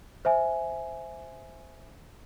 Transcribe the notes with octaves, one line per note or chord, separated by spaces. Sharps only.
C5 E5 G#5